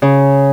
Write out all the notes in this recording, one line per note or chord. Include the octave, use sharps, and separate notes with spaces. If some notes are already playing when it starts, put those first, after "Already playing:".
C#3